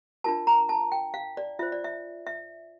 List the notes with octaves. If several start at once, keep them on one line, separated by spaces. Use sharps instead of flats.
D4 F4 A#4 A5
A#5
A5
G5
F5
D5
F4 C5 E5
D5
E5
E5